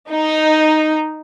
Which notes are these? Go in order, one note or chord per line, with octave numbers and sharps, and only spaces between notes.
D#4